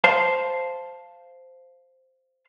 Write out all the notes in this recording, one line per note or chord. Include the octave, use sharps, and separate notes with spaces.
C5 F5 A5